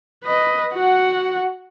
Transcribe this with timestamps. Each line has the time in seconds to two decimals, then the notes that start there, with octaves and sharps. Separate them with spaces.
0.24 B4 D#5
0.74 F#4 F#5